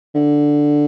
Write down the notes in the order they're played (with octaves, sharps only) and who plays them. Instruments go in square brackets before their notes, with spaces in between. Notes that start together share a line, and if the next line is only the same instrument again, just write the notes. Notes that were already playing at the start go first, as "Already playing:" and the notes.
[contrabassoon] D3